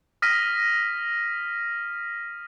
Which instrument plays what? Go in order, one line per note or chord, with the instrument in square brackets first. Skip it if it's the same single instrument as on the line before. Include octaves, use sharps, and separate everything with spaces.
[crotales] D#6 F6 A#6 B6 D#7